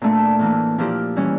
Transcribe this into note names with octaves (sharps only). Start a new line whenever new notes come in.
A#2 A3 D4
A2 E3 A#3
A#2 F3 A#3 E4 G4
E3 G3 C#4